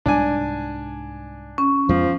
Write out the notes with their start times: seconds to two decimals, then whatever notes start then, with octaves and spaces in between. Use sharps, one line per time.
0.06 C2 G#2 G3 D4 G#5
1.58 C#4
1.89 F2 F3 G#3 B3